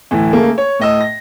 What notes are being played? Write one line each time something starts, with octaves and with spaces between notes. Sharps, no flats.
D2 A2 E3
C#3 A3 A#3
C#5
A2 D#5 E6
A#6